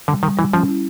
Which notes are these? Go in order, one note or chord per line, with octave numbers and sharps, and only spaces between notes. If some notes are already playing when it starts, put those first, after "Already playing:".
D3 G3
D#3 G3
E3 G3
F3 C#4
E4